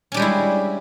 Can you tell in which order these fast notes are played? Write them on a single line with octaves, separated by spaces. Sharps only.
C#4 D4 G3 G#3 E4